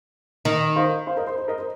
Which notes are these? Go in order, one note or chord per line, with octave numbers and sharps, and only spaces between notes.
D#3
C5 F5
C5 F5
A#4 D#5
C5
C5
A#4 D#5
C5